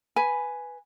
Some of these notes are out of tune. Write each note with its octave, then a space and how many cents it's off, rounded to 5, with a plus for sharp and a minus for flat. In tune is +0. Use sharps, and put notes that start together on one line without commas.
B4 +0 G#5 +0